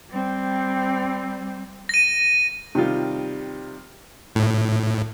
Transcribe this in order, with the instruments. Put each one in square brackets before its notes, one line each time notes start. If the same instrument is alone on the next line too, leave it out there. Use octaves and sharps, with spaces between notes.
[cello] G3 C4
[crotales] A#6 D#7
[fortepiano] C3 D#3 G3 F4
[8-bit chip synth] A2